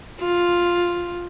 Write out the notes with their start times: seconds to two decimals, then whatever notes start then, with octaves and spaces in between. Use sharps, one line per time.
0.20 F4